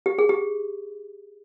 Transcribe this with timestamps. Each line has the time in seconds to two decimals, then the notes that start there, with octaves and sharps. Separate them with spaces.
0.06 G4
0.18 G#4
0.29 G4